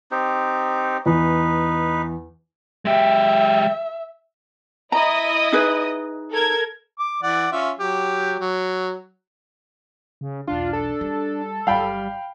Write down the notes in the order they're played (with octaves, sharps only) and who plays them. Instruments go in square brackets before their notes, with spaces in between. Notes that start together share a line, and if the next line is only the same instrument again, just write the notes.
[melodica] C4 D#4 G4
[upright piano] E2 [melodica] D#4 B4
[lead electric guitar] G#3 G4 [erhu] E5
[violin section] E4 D#5 D#6 [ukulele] A#5
[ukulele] D#4 G#4 B4
[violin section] A4 A#4 G#6
[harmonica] D6
E3 D5 F#5
C#4 F4 E5
F#3 G4
F#3
[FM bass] C#3
[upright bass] B1 E2 [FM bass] D4 [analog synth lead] F4
[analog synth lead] A4
[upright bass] G3
[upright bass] G1 F#2 [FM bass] G3 [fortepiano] F5 G5 B5